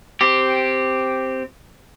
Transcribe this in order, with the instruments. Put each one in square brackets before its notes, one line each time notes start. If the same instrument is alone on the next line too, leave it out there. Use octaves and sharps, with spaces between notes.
[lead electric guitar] C4 G4